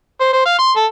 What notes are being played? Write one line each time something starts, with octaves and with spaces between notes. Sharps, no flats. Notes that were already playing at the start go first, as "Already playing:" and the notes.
C5
C5
F5
C6
A4